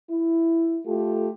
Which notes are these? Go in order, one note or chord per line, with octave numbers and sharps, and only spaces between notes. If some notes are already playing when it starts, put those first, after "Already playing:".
E4
A3 F4 G4 A4